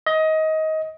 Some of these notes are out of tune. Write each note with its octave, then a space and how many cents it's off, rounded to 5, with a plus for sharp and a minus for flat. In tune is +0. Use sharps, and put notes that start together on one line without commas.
D#5 +20